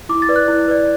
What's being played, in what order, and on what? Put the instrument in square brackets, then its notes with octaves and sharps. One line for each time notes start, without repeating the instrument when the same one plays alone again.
[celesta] E4 D6
A6
B4 D5
F#6
E4
B4 D5